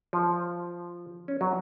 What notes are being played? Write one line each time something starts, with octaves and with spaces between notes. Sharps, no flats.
F3
C#4
F#3